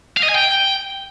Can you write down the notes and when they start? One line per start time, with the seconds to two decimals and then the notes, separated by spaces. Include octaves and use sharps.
0.17 F5
0.23 D#5
0.29 G#5
0.35 G5